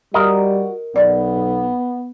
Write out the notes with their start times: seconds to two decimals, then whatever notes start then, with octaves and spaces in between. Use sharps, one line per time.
0.14 G3 F#4 A#4 D#5
0.96 B1 B3 D5